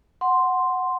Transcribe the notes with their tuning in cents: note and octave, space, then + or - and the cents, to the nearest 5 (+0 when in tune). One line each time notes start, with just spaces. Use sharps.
F#5 +0 C6 +0